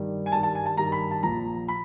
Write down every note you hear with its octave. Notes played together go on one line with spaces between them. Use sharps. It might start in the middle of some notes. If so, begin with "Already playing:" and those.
Already playing: G2 D#3 G3
G#5
G2 D#3 G3 A5
A5
G#5
A5
G2 D#3 G3 A#5
B5
A5
A#1 A#2 F3 A#5
B5